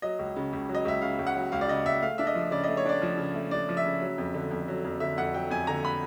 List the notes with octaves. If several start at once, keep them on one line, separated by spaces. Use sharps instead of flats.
F#3 D#5
C#2
C#3
C#2
F#3
D#5
C#2 E5
C#3 F5
C#2
F#5
F#3
C#2 F5
D5
C#3 D#5
C#2 E5
A3 F5
D4 E5
D#5
F3
C#3 D5
D#5
A3
C#5
D4 D5
F3
C#3
A3
D4 D5
F3
E5
C#3
F#3
F2
D3
F2
F#3
F2
D3 E5
F2 F#5
F#3 G5
F2 G#5
D3 A#5
B5